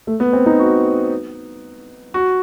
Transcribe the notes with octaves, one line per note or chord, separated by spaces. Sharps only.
A3
B3
C4
D#4
F#4
F#4